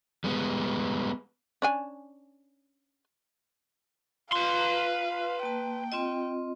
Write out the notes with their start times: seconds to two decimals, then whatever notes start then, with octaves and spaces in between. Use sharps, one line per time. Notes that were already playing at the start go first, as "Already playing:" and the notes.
0.24 G3 G#3 B3
1.62 C#4 D4 G#5
4.33 F4 B4 F5 C6
5.43 A#3 G5 A5
5.92 C4 F4 D#5